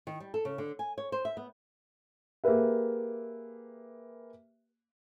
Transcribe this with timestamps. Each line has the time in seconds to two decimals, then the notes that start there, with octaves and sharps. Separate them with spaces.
0.07 D#3
0.20 G3
0.34 A4
0.45 C#3
0.58 D3
0.79 G#5
0.98 C#5
1.12 C5
1.25 E5
1.37 B3
2.44 A#3 G4 G#4 B4 E5